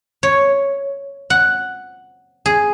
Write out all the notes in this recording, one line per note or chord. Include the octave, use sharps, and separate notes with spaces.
C#5
F#5
G#4